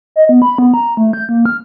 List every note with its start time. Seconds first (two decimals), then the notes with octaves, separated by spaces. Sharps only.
0.16 D#5
0.29 B3
0.42 B5
0.58 B3
0.74 A#5
0.97 A3
1.13 G6
1.29 A#3
1.46 F6